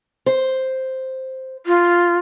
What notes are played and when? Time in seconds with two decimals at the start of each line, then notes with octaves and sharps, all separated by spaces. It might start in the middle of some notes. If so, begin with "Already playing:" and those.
0.26 C5
1.66 F4